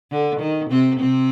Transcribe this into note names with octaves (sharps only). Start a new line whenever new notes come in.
D3
D#3
C3 C4
C3 C4